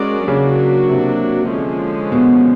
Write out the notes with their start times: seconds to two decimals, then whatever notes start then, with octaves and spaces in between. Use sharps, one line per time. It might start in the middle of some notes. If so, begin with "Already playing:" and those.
Already playing: G#3 C#4 F#4 A#4 D5
0.27 C#3 F#3 A#3 D4 F#4
0.89 C3
1.50 D3 F3 G#3 C#4
2.12 B2